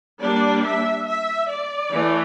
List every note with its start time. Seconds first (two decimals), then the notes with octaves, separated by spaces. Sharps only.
0.21 G3 A#3 D4 D5
0.64 E5
1.07 E5
1.50 D5
1.92 E3 A3